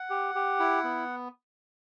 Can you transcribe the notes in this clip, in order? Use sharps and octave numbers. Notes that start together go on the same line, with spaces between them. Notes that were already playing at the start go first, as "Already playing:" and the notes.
Already playing: F#5
G4
G4
E4
B3